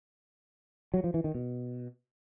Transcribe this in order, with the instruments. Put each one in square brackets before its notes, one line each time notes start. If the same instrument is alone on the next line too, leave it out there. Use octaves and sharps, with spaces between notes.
[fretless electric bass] F#3
F3
E3
D#3
B2